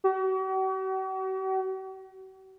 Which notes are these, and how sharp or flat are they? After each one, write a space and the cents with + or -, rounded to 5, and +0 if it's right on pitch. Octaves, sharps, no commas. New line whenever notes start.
F#4 +45